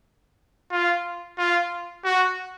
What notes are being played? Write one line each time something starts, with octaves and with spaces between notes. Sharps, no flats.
F4
F4
F#4